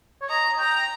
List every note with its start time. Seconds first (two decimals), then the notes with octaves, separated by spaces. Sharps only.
0.22 C#5
0.29 D#5 A#5
0.59 G5 A#5